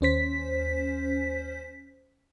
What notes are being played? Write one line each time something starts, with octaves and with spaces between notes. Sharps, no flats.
D#2 C#4 C5 B6